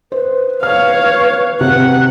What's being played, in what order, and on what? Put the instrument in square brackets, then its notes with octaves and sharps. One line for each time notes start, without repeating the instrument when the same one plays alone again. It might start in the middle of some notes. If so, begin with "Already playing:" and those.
[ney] B4 [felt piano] C5
[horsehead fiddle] C#5 F5 [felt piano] F6
[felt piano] C3 [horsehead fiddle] F#5